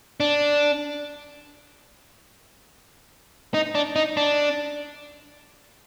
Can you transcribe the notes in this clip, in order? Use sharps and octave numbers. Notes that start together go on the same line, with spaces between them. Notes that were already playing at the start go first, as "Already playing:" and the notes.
D4
D#4
D4
D#4
D4